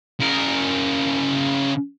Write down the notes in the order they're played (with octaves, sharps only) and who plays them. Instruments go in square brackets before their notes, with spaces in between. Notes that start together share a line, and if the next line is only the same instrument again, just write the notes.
[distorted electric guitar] C#3 A#4